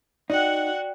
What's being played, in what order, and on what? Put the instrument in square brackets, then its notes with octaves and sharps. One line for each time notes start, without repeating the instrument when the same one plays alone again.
[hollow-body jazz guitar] D#4 [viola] F#4 F#5 [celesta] D5 G5